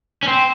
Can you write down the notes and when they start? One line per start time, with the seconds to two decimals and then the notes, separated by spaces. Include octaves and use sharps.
0.23 C#4
0.28 C4